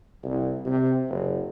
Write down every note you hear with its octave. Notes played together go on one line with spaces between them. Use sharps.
C2
C3
F#1